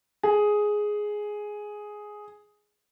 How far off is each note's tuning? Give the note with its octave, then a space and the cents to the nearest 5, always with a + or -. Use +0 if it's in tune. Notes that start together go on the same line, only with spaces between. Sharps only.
G#4 +5